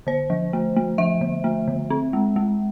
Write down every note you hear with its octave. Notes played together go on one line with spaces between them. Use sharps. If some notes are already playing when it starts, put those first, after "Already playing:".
D3 C5
F3
A3
A3
F3 E5
D3
A3
D3
C4
G#3
G#3